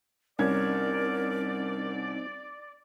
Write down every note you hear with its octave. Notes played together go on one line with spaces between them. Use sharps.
C2 C4 C#4 D#4 A#4 D5 G#6